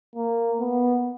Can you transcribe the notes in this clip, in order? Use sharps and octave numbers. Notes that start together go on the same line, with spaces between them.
A#3
B3